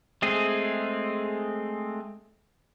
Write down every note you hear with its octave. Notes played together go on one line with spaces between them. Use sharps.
G#3 A3 C4 G#4